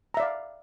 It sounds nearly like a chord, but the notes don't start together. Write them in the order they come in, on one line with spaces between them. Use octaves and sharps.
A#5 E5 D5 F5